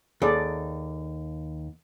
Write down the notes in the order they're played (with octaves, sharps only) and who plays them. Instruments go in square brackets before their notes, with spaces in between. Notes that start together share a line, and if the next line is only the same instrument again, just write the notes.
[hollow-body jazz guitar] D#2 [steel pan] G#4 A4 D5